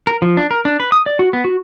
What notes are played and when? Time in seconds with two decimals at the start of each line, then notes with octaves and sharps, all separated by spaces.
0.07 A#4
0.22 F3
0.37 D4
0.51 A#4
0.65 D4
0.80 B4
0.92 D#6
1.06 D5
1.19 F#4
1.33 B3
1.45 F#4